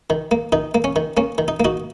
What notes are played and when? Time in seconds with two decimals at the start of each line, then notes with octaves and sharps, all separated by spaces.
0.10 D#3
0.31 A#3
0.52 D#3 D#4
0.75 A#3
0.84 C#4
0.96 D#3
1.17 A#3 C#4
1.38 D#3
1.48 D#4
1.60 A#3 D#4 F#4